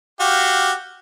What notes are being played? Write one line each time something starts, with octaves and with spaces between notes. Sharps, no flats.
F#4 G4 F5